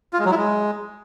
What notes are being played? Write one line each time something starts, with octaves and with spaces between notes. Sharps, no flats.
F4
G#3
F#3
E4
G#3